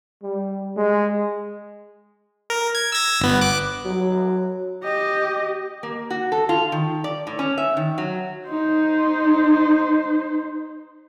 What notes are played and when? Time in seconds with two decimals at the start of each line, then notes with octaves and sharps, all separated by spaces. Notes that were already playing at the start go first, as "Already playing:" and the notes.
0.23 G3
0.76 G#3
2.50 A#4
2.75 G#6
2.92 E6 G#6 A#6
3.20 G1 B3
3.41 D6 F#6
3.85 F#3
4.83 G4 D#5
5.83 A#3
6.10 F#4
6.32 A4
6.49 F4
6.72 D#3
7.04 D5
7.27 A2
7.39 C#4
7.58 E5
7.77 D#3
7.98 F#3
8.49 D#4 C5